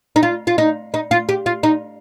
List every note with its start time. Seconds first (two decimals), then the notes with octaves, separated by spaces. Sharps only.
0.16 D#4
0.23 F4
0.47 F4
0.58 D#4
0.94 D#4
1.11 F4
1.29 G4
1.46 F4
1.63 D#4